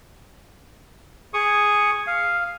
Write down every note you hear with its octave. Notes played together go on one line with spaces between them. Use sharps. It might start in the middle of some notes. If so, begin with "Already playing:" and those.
G#4 C#6 D#6
F5